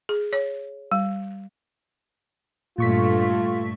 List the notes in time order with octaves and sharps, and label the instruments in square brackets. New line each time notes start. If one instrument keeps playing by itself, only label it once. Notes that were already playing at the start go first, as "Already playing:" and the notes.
[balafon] G#4
C#5
G3
[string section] G2 A3 [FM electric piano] A#2 C#6 B6 [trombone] F4